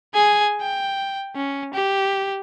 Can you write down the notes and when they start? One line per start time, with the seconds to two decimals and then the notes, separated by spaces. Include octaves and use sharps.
0.14 G#4 G#5
0.61 G5
1.35 C#4
1.74 G4